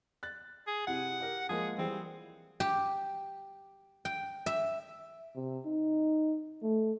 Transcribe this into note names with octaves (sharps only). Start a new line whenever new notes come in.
F#6 A6
G#4
C3 E4 G4 F#5
G4 A#4
F3 G#3 A#3 G#4
E3 G3 C4 G#4
G4
G5
E5
C3
D#4
A3